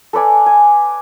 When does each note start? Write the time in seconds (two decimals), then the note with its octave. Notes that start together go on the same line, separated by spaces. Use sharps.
0.13 A4 B4 D5 G#5
0.46 G#5